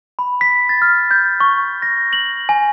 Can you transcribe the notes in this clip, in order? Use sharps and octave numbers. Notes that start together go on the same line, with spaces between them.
B5
B6
A6
F6
G6
C#6
A#6
F#7
G#5